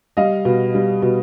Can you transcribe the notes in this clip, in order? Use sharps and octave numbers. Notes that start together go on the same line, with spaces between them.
G3 D#5 F5
B2
G3
B2